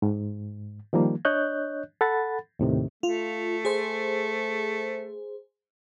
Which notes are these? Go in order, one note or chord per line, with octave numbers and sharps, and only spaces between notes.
G#2
D#3 F3 G3 A#3
D4 C#5 D#5 F#6 G6
A4 F#5 B5 A6
D#2 A2 C3 D#3
A3 F4
G#4 C5